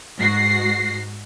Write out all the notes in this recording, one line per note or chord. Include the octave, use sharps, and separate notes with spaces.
G#2 F#4 A#6 C7